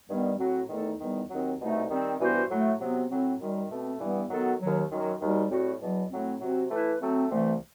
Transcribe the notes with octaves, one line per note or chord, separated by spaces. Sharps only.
G2 D#3 G3 B3
A2 F#3 C4 F#4
E2 D#3 A3 D#4 A4
E2 D#3 G3 B3 D#4
D#2 D#3 F#3 C4
C2 B2 A3 D#4
D#3 G3 C4
G2 E3 B3 F#4 C5
A2 F#3 A3
C3 F#3 B3 F#4
A2 F#3 C4
F#2 D#3 G3
B2 A3 C4
G2 E3 G3 B3
D#3 F#3 B3 F#4 A4
D#2 D#3 F#3
F#2 D#3 F#3
D#2 D#3 G3 D#4 F#4
A2 G3 C4 F#4
E2 B2 F#3
A2 F#3 A3 C4
C3 F#3 C4 F#4
E3 A3 E4 B4
F#3 A3 C4
C2 C3 E3 A3